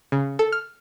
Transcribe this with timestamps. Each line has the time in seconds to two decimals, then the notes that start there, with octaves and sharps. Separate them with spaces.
0.12 C#3
0.39 A4
0.52 F6